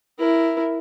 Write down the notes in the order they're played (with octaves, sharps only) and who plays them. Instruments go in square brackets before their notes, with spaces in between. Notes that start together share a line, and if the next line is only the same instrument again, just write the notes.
[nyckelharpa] E4 A#4